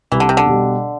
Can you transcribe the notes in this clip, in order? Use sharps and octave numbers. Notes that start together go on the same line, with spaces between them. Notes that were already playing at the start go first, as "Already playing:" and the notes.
C2 E3
D3
C3
D3
B2 G3